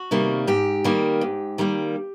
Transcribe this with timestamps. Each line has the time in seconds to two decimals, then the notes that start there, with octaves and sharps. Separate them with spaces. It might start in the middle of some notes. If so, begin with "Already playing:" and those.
Already playing: F#4
0.11 C3 D#3 G3 A#3
0.47 G#2 G4
0.84 D#3 G3 A#3
1.21 G#2
1.58 D#3 G3 A#3